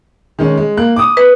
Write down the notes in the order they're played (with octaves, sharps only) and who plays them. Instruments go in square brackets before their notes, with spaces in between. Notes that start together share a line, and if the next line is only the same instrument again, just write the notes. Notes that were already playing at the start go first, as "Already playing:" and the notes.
[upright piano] D#3 G#3 C#4
G#3
A#3 F#6
D6 D#6
[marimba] B4